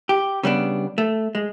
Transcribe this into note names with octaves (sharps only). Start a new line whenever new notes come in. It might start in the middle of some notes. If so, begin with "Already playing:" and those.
G4
C#3 G3 B3 D4
A3
G#3